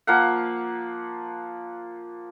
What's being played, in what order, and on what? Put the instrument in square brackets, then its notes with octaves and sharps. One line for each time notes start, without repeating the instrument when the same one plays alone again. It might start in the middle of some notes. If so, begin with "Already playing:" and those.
[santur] F3 A#3 F5 F#5